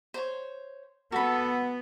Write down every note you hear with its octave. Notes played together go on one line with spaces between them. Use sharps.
C5 C#5
B3 F#4 A4 B5